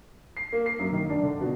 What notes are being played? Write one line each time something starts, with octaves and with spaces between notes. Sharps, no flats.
C7
A#3
C7
F#2
D#3
D4
D3
B2